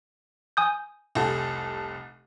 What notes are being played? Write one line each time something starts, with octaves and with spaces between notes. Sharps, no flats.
G#5 D#6 G6
F1 C2 A4